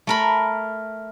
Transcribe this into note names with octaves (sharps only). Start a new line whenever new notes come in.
A3 A#4 B5